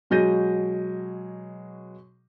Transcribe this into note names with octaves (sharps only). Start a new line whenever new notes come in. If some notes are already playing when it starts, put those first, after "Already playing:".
B2 F#3 G#3 G6 A#6 D#7